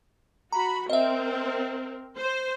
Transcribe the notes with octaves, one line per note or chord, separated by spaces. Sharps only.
F#4 A#5 B5
C4 A#4 D#5 E5
C5